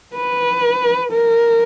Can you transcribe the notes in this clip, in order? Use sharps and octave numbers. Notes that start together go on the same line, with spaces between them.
B4
A#4